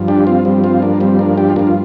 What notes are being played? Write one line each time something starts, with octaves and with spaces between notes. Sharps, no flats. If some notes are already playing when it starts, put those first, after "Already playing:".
Already playing: G2 F3
D4 G4
C4 F4
G3 C4
C4 F4
A#3 D4
G3 C4
A#3 D4
D4 G4
F4
G2 F3 A#3 D4
F4